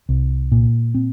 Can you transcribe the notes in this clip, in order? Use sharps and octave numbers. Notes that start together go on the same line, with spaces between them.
C2
A#2
C4